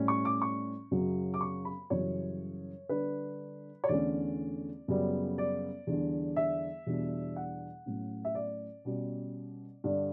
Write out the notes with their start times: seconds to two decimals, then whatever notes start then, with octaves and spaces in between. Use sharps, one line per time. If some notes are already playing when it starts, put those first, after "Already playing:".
Already playing: A2 G3 C#4
0.08 C#6
0.25 D6
0.42 C#6
0.91 F#2 C#3 F#3
1.34 D6
1.41 C#6
1.65 B5
1.90 F#2 C#3 E3 G3 C#5
2.89 D3 G3 D4 B4
3.84 C#5
3.88 E2 D3 A3 C#4 D5
4.88 F#2 C#3 G3 B3
5.38 D5
5.87 E2 D3 G3 D4
6.36 E5
6.87 E2 B2 G3 D4
7.36 F#5
7.86 A2 F#3 C#4
8.25 E5
8.35 D5
8.85 B2 G3 C#4
9.84 G2 D3 G3 D4